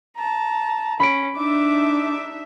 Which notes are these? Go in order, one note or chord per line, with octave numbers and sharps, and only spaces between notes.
A5 A#5
C#4 B5 D7
D4 D#4 E5 D6